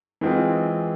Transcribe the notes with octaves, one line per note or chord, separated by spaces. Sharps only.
E3 G#3 C4 F4 G#4